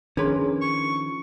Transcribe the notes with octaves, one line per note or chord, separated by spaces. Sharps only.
D#3 F3 C#4 D4 G#4 A#4 B4 C6
C#6